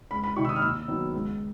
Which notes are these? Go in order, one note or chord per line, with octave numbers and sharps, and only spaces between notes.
C#2 B5
B5
C3 D#3 C#6
E6
D#6
F6
D#2 E6
D#3 F#3 B3
C#2